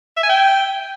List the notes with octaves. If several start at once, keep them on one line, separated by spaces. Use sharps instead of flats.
E5
G#5
G5